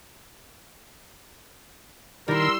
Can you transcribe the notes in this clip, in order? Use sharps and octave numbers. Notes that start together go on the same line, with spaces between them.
D#3 G3 E4 A#4 C6 E6